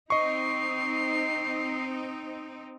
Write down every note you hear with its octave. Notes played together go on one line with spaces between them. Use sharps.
C4 D#4 D#5 C#6 C7